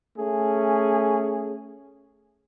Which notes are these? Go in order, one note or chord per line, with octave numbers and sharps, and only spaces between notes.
A3 C#4 G#4